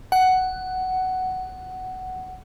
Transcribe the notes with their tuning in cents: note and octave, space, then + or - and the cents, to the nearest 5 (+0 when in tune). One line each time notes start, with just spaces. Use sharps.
F#5 +10